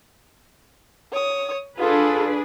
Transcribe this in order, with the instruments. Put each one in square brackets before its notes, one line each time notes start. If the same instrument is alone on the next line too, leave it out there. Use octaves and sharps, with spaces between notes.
[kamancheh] C#5 D#6
[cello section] D4 G#4 B4 [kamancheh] F4 A4